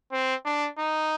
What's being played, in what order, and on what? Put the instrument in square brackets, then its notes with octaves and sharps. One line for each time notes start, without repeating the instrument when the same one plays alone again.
[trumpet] C4
D4
D#4